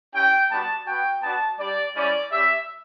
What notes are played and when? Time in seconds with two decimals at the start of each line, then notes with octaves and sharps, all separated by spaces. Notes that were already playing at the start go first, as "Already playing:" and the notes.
0.14 C#4 E4 G4 G5
0.50 G3 B3 D4 F#4 A5
0.86 B3 F#4 G5
1.23 B3 D4 F#4 A5
1.59 G3 D4 G4 D5
1.95 G3 C#4 E4 D5
2.32 G3 C#4 G4 E5